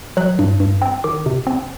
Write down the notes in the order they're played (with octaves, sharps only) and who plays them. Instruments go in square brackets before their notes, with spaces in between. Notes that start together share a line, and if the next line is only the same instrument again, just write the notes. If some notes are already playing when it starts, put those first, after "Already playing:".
[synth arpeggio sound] F#3 F#6
G2
G2
C4
D#3 D6
C3
C4